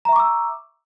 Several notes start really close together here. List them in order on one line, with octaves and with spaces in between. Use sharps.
A#5 E5 C#6 D6 E6